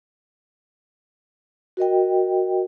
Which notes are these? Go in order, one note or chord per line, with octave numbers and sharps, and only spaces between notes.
F#4 A#4 D#5 G5